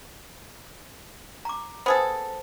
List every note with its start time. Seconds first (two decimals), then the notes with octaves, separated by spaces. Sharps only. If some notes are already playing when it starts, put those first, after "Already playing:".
1.45 A#5 D6
1.86 B3 G#4 A4 C5